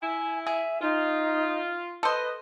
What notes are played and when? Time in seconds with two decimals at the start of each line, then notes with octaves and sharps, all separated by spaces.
0.01 E4 G#5
0.47 G#4 E5
0.82 D#4 F4
2.03 A4 B4 C5 D#5